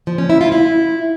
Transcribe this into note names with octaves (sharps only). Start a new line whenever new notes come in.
F3
C#4
E4
F4
E4